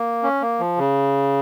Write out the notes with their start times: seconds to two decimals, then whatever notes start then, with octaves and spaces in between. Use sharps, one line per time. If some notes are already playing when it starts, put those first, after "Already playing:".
Already playing: A#3
0.23 C#4
0.42 A#3
0.60 F3
0.79 C#3